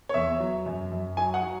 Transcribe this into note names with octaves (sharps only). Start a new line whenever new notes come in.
C#5
E2 E5
F#3
F#2
F#2
F#3 G#5
F#5
F#3